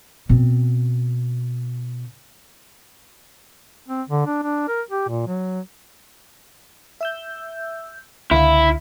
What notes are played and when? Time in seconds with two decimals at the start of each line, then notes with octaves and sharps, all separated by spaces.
0.29 B2 C4
3.88 C4
4.09 D3
4.27 D4
4.43 D4
4.68 A#4
4.91 G4
5.09 A#2
5.28 F#3
7.01 E5 E6 G6
8.31 C#2 D3 E4 F5